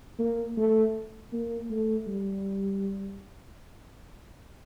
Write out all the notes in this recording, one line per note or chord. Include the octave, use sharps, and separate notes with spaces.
A#3
A3
A#3
A3
G3